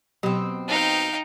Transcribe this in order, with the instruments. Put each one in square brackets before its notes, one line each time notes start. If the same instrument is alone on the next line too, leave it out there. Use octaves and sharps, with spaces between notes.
[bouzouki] B2 C4 [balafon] F#3 G4
[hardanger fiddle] D#4 [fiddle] F5 G5